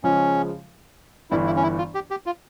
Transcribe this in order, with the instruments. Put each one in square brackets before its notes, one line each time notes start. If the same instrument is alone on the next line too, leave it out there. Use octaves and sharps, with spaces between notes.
[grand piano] C#3 F3 G#3 [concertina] C#4
[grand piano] G1 G2 E3 [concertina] E4
[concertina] E4
C#4
E4
F4
G4
G4
F4